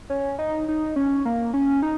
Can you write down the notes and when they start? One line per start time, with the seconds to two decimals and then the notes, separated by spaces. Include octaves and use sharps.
0.10 C#4
0.39 D#4
0.68 D#4
0.96 C#4
1.25 A#3
1.54 C#4
1.82 D#4